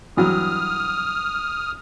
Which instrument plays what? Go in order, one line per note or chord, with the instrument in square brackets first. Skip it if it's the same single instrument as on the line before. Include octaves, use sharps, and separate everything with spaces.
[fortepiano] G2 E3 F#3 [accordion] D#6 F6